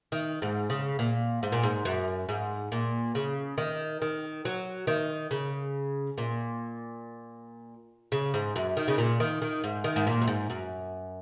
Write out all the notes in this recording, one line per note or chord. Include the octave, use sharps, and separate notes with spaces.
D#3
G#2
C#3
A#2
G#2
A#2
G#2
F#2
G#2
A#2
C#3
D#3
D#3
F#3
D#3
C#3
A#2
C#3
G#2
F#2
D#3
C#3
A#2
D#3
D#3
G#2
D#3
G#2
A#2
F#2
G#2
F#2